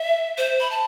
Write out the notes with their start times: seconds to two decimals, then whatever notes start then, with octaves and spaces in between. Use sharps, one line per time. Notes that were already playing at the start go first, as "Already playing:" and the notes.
Already playing: E5
0.38 C5
0.60 B5
0.71 A5